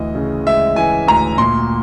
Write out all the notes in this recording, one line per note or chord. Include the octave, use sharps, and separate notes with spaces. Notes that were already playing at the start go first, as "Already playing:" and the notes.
Already playing: D2 E3 D#5
C#3
G#3 E5
E3 G#5
D2 A#5
A#2 C6